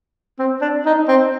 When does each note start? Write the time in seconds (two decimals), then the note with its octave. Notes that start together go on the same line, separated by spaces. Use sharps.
0.39 C4
0.61 D4
0.86 D#4
1.08 C4